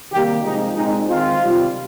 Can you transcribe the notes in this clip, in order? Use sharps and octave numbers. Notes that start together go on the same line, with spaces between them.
C3 D#3 G3 A#3 G4
C3 F3 G#3 D#4
A#2 G#3 C4 D#4
D#3 G#3 C4 F4
C3 D#3 G3